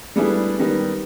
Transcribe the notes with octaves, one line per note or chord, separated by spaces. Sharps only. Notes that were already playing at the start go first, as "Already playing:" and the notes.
G3 A3 B3 D4 E4 G#4
D#3 G3 B3